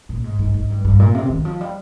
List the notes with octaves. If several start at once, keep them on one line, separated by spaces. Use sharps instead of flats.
A#2
G#2
G#2
G#2
G2
G2
A#2
C3
D#3
F3
G3